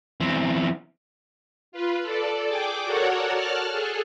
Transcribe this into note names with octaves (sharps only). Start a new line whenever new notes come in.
E2 C4
F4 B4
A4 D5
G#4 G5 D6
F#4 A4 A#4 C#5 D5 F#5
A5 F6 F#6
G#4 A4